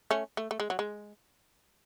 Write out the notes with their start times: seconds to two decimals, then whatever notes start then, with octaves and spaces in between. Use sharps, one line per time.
0.11 A3 C#4
0.37 A3
0.51 A3
0.60 G#3
0.70 F#3
0.79 G#3